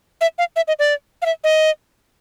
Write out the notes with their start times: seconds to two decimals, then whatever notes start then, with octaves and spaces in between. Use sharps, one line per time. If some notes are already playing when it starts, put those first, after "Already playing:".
0.21 E5
0.38 F5
0.56 E5
0.68 D#5
0.79 D5
1.22 F5
1.26 E5
1.44 D#5